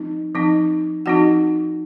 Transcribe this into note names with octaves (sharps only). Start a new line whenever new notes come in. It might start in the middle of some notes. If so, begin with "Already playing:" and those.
Already playing: F3 C4 D#4
F3 C4 D#4
F3 C4 D#4 F#4 F#5